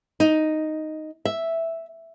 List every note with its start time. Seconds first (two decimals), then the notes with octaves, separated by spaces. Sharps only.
0.20 D#4
1.25 E5